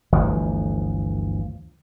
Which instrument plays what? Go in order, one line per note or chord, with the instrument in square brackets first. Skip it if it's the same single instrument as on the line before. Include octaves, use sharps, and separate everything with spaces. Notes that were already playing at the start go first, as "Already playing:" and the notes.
[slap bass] G1 D2 E3 F3